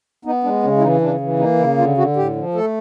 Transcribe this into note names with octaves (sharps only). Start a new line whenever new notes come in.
B3 D#4
G#3 D4
C#3 C#4
E4
E3 D#4
C#3 D4
E3
A#3 D#4
C#3 E4
D3 F4
D3 F#4
A2 G4
F3
A3 A4